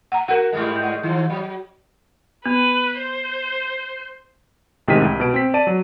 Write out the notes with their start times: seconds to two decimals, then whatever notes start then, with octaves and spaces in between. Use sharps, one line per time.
0.12 F#5 A#5
0.28 F#4 A#4 F#5
0.53 G#2 G3 G#3
0.83 F#5
1.03 D#3 F3
1.30 F#3
2.46 B3 B4
3.00 C5
4.88 A1 C3 D#3 G#3 B6 D#7
5.02 C2
5.20 B2 D7
5.34 C4 B6
5.54 D5 A5 D#7
5.67 F#3